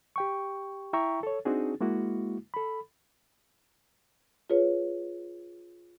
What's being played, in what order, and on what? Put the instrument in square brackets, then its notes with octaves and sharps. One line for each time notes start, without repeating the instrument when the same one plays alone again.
[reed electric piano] G4 G5 C#6
E4 E5 G5 A#5 C#6
A4 C#5
C4 D4 D#4 F#4 G#4
G#3 A#3 E4 F#4
A4 B5
[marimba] F4 G#4 B4 C#5